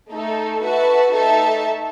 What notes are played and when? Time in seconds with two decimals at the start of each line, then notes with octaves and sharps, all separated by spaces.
0.10 A3 D#4 A4
0.62 F#4 B4 E5 A5
1.13 A3 D#4 A4 E5 A5